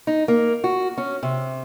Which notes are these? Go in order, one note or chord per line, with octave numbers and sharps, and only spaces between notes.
D#4
A#3
F#4
C#4
C3